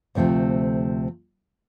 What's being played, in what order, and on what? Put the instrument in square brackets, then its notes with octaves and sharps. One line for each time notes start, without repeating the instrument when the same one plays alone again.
[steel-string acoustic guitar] D2 C3 F3 A3 C4